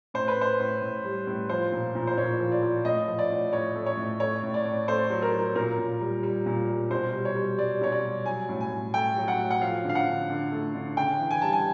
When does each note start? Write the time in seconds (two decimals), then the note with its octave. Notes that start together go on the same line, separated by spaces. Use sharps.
0.14 A2 C5
0.28 B4
0.37 A2 C5
0.60 A2
0.82 A2
1.05 G3
1.27 A2
1.49 F3 C5
1.72 A#2
1.95 A#2
2.07 C5
2.17 A#2 C#5
2.40 F3
2.52 D5
2.63 F3
2.85 A2 D#5
3.08 F3
3.19 D5
3.30 A2
3.53 A2 C#5
3.75 A3
3.86 C#5
3.97 A2
4.20 A3 C#5
4.43 A2
4.54 D5
4.65 A2
4.88 A3 C5
5.10 F#3
5.22 A#4
5.33 F#3
5.55 A#2 A#4
5.78 A#2
6.01 G3
6.23 G3
6.46 A#2
6.69 G3
6.90 B2 C5
7.13 G3
7.25 C#5
7.36 G3
7.58 G3 D5
7.81 B2 C#5
7.92 D5
8.04 G3
8.26 F#3 G#5
8.49 A2
8.60 G#5
8.71 A2
8.94 A3 G5
9.16 F#3
9.28 F#5
9.39 A2
9.51 F#5
9.61 F3 F5
9.84 D3
9.89 F5
9.95 F#5
10.06 D3
10.29 D3
10.52 A3
10.74 D3
10.97 C#3 G5
11.20 E3
11.31 G#5
11.41 G3 A5
11.53 G#5